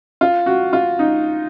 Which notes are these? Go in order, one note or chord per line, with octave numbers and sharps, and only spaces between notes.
F4
F#4
F4
D#4